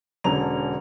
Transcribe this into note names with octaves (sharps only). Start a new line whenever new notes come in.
E1 D3 C#4 A#5 F7